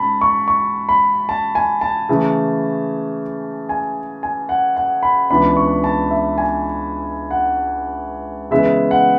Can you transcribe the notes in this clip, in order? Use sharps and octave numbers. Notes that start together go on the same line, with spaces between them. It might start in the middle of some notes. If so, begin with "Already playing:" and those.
Already playing: G#2 C#4 A5 B5
C#6
C#6
B5
A5
G#5
A5
C#3 E3 A3
G#5
G#5
F#5
F#5
B5
C#2 C#3 E3 B3 D4 B5
C#6
A5
E5
G#5
F#5
C#3 E3 G#3 B3 E4 E5
F#5